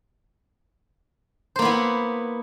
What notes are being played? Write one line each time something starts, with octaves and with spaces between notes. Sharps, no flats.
A#3 B3 E4 C5